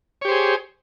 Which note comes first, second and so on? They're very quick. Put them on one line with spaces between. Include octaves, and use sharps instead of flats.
C#5 G4 C5 G#4